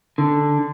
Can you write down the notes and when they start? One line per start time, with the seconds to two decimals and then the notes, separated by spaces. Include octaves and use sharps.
0.18 D3